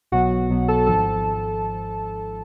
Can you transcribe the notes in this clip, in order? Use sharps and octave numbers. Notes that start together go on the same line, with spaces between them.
B1 B2 F#3 B3 F#4 F#5
B1 B2 F#3 B3
A4 A5
G#1 G#2 F3 A4 A5